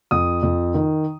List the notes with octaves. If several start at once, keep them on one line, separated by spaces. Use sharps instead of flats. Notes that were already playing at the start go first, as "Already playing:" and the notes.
F2 D#6
F2
D#3